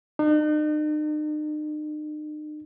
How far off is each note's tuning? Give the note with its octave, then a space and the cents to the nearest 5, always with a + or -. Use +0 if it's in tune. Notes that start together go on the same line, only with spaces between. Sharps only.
D#4 -45